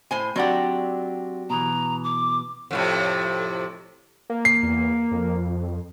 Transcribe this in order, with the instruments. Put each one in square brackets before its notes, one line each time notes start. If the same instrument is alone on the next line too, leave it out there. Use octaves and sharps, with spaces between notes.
[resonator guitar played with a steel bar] A2 C5 G#5
[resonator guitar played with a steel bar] F#3 D4 G4 [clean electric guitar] C4 D5 F#5
[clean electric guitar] B2 E3 [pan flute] A#5
[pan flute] D6
[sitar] F2 A2 C3
[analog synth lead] A#3
[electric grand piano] C7
[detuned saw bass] E2
F2